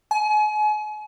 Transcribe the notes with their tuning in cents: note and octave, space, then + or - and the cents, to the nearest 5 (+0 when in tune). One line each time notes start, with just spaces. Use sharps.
G#5 +35